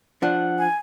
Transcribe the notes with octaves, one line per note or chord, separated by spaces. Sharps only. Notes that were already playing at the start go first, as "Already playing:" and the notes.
F3 D4 F#5
G#5